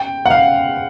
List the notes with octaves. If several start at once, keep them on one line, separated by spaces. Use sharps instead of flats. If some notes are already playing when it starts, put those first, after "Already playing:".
Already playing: G5
F#5
F5